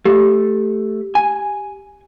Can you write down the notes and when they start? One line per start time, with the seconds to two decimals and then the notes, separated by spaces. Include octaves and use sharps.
0.05 A3 G4
1.15 G#5